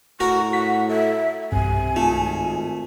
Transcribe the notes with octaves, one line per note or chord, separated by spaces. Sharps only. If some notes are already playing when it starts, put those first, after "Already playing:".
A2 F#4 A#4 C#6
F#5 B6
A4 E5
B1 G2 C3 G#5
G#1 A3 F4